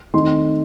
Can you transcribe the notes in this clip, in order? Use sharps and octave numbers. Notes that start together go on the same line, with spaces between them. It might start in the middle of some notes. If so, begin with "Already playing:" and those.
D#3 A3 C4 D#4 C6